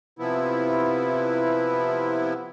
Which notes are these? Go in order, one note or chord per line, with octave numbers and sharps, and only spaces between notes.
C3 F3 B3 E4